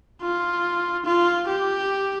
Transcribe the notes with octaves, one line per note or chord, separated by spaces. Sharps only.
F4
F4
G4